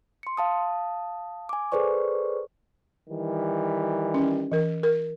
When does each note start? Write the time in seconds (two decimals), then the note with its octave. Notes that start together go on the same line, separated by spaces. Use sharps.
0.23 C6 C#7
0.37 F5 A5 D#6
1.49 G#5 D6
1.72 G#4 A4 B4 C5 D5 C#6
3.08 D#3 E3 G3
4.14 C#4
4.52 E3 A#4
4.83 A#4